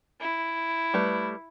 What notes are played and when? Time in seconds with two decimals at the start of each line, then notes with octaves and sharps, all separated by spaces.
0.21 E4
0.94 G3 A3 B4